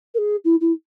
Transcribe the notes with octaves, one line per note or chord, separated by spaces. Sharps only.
A#4
G#4
E4
E4